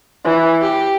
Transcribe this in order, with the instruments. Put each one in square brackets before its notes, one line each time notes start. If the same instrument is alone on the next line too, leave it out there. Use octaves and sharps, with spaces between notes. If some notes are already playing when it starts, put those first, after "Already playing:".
[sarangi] E3
G4